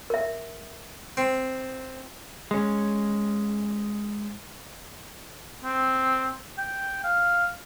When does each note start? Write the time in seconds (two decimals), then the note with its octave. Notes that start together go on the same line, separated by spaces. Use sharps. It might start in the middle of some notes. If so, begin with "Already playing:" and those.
0.10 A#4 E5
1.17 C4
2.51 G#3 C#4
5.64 C4
6.58 G5
7.04 F5